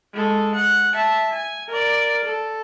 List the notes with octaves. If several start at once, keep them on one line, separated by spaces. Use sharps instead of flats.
G#3 A4
F#5
E5 A5
G#5
A#4 D5
A4